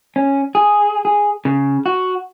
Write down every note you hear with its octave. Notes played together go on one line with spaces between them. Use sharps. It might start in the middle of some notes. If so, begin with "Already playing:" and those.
C#4
G#4
G#4
C#3
F#4